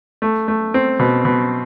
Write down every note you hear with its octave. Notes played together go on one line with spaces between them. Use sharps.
A3
A3
C4
B2
B2